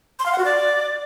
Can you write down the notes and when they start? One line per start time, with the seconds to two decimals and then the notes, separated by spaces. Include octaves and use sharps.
0.19 C6
0.26 F5
0.32 F#5
0.38 F#4
0.45 D5